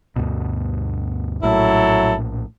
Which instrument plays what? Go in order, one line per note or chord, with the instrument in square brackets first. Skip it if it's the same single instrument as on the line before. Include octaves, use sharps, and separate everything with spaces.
[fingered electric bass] D2 G2 B2
[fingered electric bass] A#1 A2 [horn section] F#3 E4 A4